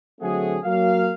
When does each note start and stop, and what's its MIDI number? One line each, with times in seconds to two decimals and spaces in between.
0.21 0.58 50
0.21 0.58 54
0.21 0.58 57
0.21 0.58 60
0.21 0.58 66
0.21 0.58 68
0.64 1.13 54
0.64 1.13 58
0.64 1.13 77